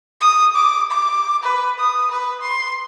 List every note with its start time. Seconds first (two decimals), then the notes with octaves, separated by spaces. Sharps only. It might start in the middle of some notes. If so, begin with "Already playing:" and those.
0.21 D#6
0.55 D6
0.91 D6
1.43 B4
1.79 D#6
2.11 B4
2.41 C6